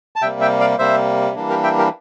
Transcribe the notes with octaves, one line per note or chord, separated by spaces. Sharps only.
A5
C3 G3 A#3 E5 G5
E5 G5
D5 F5
C3 G3 A#3 C5 E5
E3 G3 A#3 D4
G4 A#4
E5 G5
G4 A#4